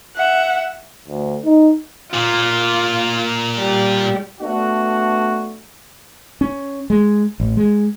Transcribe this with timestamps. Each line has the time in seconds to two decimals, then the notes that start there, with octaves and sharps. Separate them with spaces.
0.15 E5 F#5
1.08 D2
1.45 D#4
2.14 A#2 A#3 F4
3.58 G3
4.41 A3 B3 D4 F#4
6.41 C#4
6.90 G#3
7.40 A1
7.57 G#3